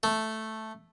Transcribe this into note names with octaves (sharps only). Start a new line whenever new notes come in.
A3